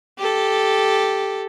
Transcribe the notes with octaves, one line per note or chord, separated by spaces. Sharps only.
G4 A4